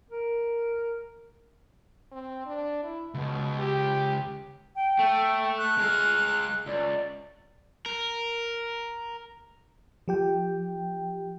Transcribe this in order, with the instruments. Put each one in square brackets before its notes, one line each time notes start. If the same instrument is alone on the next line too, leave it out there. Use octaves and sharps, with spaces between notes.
[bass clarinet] A#4
[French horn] C4
D4
E4
[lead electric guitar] C#2 [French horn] B2
[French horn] G4
[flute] G5
[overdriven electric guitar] A3
[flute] F#6
[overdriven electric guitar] G#3 F5
[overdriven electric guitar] C#2 [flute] D5
[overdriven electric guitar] A#4
[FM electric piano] F3 G4 G5